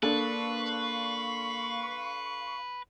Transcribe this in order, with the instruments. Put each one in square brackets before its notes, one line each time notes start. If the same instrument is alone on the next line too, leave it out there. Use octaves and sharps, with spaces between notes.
[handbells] A#3 [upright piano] D4 A4 [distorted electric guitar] B4 [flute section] F5 C6 C#6